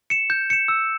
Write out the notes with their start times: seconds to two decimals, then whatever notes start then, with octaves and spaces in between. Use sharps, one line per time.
0.10 C#7 E7
0.30 G6
0.50 C#7 E7
0.68 E6